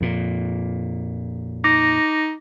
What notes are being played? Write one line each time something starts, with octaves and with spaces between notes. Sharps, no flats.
F2 A#2
D#4 D6 A#6